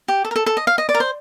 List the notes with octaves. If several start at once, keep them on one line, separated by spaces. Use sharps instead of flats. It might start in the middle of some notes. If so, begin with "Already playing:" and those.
G4
A4
A#4
A4
A4
D#5
F5
D#5
D5
A#4
C5